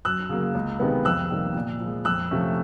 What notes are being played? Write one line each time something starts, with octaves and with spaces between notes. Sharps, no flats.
F#2 E6 F#6
C#3 F#3 A#3
C#2
C3 D#3 G#3 B3
F2 E6 F#6
C3 D#3 G3 A#3
A#2
F3 G#3
F2 E6 F#6
C3 F3 A3 C#4